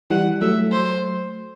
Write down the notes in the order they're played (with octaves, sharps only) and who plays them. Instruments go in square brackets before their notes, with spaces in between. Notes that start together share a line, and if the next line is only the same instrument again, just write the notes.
[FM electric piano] E3 G3 [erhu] F#5
[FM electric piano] F#3 A3 [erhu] E5
[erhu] C5